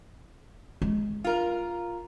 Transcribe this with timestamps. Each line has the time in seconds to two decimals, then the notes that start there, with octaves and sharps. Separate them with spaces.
0.82 G#3
1.24 F4 A#4